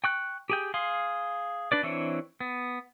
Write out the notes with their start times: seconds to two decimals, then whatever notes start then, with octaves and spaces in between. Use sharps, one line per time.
0.04 G5 C#6 F#6
0.50 G4 G#4 G5
0.74 G#4 F5 C6
1.72 D4 B4 D5
1.83 E3 C4 D4 E4 C#5
2.40 B3